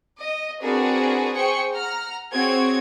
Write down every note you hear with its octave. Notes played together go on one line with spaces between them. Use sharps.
D#5
C4 D4 F#4 G#4 A#4 B4
G#4 C5 G5 C#6 C#7
F#5 A#5 F6
C4 F#4 G#4 C#5 G#6